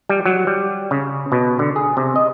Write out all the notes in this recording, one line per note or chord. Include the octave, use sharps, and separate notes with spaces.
G3
F#3
G3
C#3
B2
D3
G#4
C3
D#5